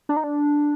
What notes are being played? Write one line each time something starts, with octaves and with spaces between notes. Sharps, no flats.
D4
D#4
D4